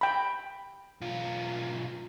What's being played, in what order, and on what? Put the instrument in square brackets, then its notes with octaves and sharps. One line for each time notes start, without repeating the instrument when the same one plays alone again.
[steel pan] G5 B5
[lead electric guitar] B1 F4